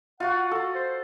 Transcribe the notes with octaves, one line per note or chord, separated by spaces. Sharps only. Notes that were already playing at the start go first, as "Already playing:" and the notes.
F4 F#4 F#5
F#4 A4
C5